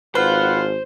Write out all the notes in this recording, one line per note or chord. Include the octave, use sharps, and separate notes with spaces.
G#1 F4 B4 C5 F#5